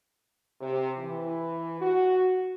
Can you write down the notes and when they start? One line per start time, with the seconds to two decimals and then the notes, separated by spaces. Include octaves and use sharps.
0.60 C3
0.98 E3
1.80 F#4